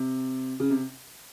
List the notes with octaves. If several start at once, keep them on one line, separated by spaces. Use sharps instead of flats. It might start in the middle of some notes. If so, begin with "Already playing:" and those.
Already playing: C3
C#3
C3